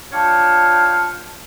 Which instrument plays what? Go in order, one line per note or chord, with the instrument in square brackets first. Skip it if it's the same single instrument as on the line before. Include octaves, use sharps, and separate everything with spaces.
[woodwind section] D4 F4 C#5 F5 G5 A5